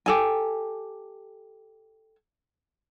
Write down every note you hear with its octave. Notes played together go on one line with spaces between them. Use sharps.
G4 A4 G#5